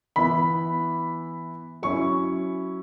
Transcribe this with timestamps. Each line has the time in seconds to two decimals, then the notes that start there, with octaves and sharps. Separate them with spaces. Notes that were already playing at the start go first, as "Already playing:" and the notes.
0.16 E3 B3 E4 B5
1.83 F#3 C#4 E4 C#6